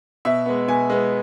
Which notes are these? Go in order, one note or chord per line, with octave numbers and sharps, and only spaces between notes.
B2 E5
G#3 B3
B2 G#5
G#3 B3